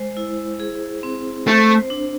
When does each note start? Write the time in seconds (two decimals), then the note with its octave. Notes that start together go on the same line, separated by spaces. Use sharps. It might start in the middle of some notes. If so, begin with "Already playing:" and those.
Already playing: G#3 C5
0.17 E4
0.60 G#4
1.03 C4
1.46 A3 C5
1.90 D4